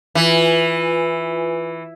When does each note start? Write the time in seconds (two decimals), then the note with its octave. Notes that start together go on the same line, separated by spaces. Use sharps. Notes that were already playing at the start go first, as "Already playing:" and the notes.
0.15 E3 F4 B4 G#5